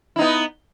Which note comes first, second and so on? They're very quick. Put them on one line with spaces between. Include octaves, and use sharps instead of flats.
E4 D#4 B3